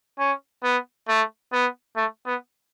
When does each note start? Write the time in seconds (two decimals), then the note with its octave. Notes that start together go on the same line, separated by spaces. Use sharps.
0.19 C#4
0.64 B3
1.08 A3
1.53 B3
1.96 A3
2.26 B3